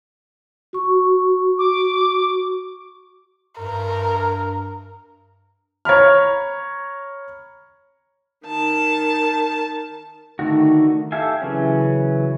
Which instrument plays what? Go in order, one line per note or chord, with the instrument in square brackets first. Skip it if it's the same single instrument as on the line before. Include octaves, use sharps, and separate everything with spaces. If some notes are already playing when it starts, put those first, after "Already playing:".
[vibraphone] F#4 C#6
[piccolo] D6
[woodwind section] G2 [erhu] A#4
[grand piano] C#5 A#5 B5 F6
[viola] D#3 A5
[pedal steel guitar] D3 D#3 A3 D#4 F#4
G4 A4 E5 F5 G#5
C#3 E3 F#3 C#4